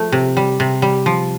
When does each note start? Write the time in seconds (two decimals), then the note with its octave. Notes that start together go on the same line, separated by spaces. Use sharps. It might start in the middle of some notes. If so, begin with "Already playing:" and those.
Already playing: F3 A3
0.12 C3
0.37 G3
0.60 C3
0.82 G3
1.06 F3